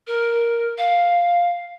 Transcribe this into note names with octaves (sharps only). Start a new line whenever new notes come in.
A#4
F5